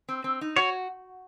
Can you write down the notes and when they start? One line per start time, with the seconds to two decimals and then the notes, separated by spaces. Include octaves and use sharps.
0.09 C4
0.24 C4
0.41 D#4
0.56 F#4 C#5